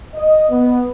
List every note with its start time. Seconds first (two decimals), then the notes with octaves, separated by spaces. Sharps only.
0.15 D#5
0.50 B3